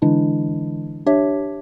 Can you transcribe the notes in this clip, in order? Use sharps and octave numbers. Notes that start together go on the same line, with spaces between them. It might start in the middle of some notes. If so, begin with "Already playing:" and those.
D3 E3 G#3 D4 E4
D4 G4 C#5 E5